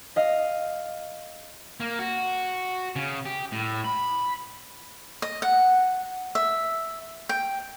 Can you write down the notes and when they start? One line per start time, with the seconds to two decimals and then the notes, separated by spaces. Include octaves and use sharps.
0.16 D#5 F5
1.80 A#3
1.99 F#4
2.96 C#3
3.26 G4
3.52 A2
3.84 B5
5.22 D#5
5.42 F#5
6.35 E5
7.29 G5